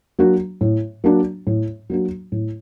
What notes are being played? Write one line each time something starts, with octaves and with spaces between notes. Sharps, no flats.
F#3 A#3 D4 F#4
A2
F#3 A#3 D4 F#4
A2
F#3 A#3 D4 F#4
A2